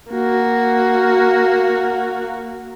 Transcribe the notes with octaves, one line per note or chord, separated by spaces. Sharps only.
A#3 F#4